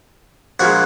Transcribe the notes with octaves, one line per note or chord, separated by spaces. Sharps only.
A#1 A#2 G#3 F#4 F#5